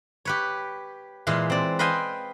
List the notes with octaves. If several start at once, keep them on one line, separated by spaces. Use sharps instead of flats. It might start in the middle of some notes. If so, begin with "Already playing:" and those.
G4 B4 C#5
A#2 E3 G#3 F5
C4 D5
B4 C5 D#5 F5 G5 G#5